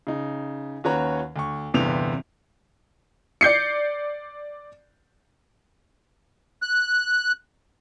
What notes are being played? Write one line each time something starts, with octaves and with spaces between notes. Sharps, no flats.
C#3 D#4
D#2 C#4 F#4 B4 C#5 A#5
D2 C#6
G1 E2 C3 G3 B3 F7
D5 G6 C7 C#7
F#6